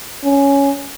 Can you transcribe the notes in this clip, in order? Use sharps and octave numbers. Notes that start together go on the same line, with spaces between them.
C#4